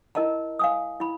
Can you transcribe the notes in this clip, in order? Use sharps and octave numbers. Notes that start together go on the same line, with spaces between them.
E4 A#4 D#5 A5 A#5
F5 G#5 D#6
E4 B5